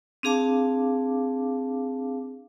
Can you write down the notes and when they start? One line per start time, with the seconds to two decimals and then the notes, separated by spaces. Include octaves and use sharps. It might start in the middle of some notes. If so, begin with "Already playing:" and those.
0.23 C4 D4 G#4 F5 A5 D6